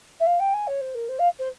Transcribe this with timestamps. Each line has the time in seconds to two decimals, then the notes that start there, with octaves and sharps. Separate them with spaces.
0.20 E5
0.26 F5
0.40 G5
0.53 G#5
0.67 C#5
0.81 C5
0.95 A#4
1.09 C5
1.19 F5
1.39 C5